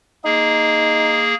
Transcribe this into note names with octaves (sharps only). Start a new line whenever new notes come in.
A#3 D#4 G#4